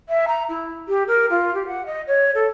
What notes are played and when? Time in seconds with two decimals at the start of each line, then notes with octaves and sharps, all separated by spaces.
0.09 E5
0.28 A#5
0.49 E4
0.88 G4
1.07 A#4
1.30 F4
1.54 G4
1.67 F#5
1.86 D#5
2.07 C#5
2.35 A4